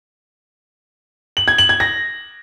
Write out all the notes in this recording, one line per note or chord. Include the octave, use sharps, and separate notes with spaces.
F#7
G#6
F#7
G#6
A#6